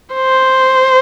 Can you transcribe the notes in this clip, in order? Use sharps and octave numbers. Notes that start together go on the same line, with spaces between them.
C5